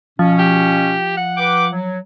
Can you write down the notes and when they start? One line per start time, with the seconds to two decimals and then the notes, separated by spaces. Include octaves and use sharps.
0.19 B2 F3 C#4
0.39 G4
1.17 F#5
1.37 B4 G5 D6
1.72 F#3